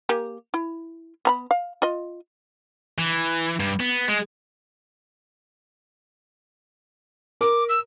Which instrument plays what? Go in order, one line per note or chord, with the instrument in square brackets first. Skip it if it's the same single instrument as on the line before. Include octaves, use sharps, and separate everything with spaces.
[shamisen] A#3 G4 G#5
E4
B3 A#5 B5
F5
F4 D#5
[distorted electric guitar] E3
G2
B3
G#3
[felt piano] A#4 [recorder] D6
[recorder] E6